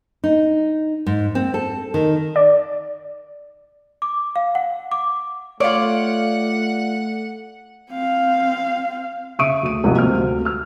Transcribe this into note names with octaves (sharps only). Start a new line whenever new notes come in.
D#4
G#2
C4
A4
D#3
D5
D6
F5
F#5
D6
A3 F4 C#5 D5 F5 F#5
C4 F5
C#3 E5 C#6 D#6 D7 D#7
D2 D#7
G#1 D#2 G#2 C3 F3 G3
D2 C4 F6
D2
E6 F6